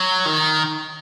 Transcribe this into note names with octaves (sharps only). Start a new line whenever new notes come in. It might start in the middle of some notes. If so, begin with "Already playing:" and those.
Already playing: F#3
D#3